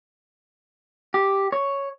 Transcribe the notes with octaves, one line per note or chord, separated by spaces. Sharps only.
G4
C#5